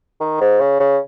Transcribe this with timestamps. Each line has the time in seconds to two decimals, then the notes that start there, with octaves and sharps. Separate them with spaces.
0.20 D#3
0.41 G#2
0.60 C#3
0.80 C#3